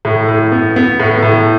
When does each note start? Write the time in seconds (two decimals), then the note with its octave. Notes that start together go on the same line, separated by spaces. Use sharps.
0.05 A2
0.29 A2
0.52 B3
0.76 B3
1.00 A2
1.23 A2